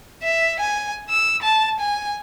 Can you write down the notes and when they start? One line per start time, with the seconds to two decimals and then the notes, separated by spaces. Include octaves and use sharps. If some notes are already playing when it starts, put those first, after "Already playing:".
0.23 E5
0.60 G#5
1.10 E6
1.42 A5
1.79 G#5